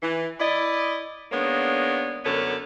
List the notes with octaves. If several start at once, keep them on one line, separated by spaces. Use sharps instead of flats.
E3
E4 D5 D#5
D#3 G#3 A#3 B3 D4 C#5
F#2 D3 B3 A4 A#4 C#5